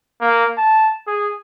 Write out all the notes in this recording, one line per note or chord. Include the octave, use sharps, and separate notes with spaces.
A#3
A5
G#4